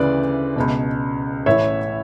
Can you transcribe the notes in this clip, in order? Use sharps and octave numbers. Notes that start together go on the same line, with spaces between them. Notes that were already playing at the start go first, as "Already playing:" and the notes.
Already playing: D2 C#3 E3 B4 D5
C#2 B2
A1 A2 E3 C#5 E5